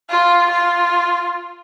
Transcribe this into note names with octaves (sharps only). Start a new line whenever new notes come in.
F4
F4